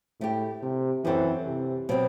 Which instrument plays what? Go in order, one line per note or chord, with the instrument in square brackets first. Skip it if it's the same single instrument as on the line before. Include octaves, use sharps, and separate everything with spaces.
[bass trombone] A2 [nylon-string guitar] A3 E4 G4
[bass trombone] C3
[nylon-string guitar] F#2 F#3 C4 F#4 A4 [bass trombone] E3
[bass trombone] C3
[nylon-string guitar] B2 F#3 C4